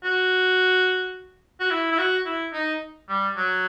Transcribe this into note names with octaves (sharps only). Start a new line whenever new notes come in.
F#4
F#4
E4
E4
F#4
E4
D#4
G3
F#3